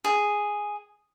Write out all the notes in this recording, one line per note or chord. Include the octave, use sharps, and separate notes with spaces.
G#4